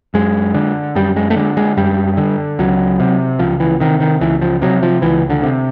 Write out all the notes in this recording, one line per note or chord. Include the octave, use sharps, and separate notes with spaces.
F#2 G#3
D3
F#2 G3
G#3
A3
D3 G#3
G#3
F#2 G3
D3
C#2 F#3
C3
C#2 F3
E3
C3 D#3
D#3
C#2 E3
F3
C3 F#3
F3
C#2 E3
D3
C3